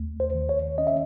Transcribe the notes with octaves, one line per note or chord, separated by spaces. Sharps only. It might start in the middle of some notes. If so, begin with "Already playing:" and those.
Already playing: D#2 A3
C5
D#3
C#5
C#4 D#5
E5